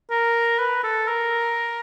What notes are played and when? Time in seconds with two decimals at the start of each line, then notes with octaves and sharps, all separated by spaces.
0.11 A#4
0.59 B4
0.84 A4
1.08 A#4